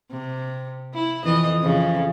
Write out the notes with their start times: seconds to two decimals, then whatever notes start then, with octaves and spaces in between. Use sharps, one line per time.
0.12 C3
0.94 E4
1.24 F2 E3 D#5
1.61 F2 C#3